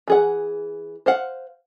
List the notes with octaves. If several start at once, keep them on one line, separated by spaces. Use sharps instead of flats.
E3 G#4 F#5
C5 F5 F#5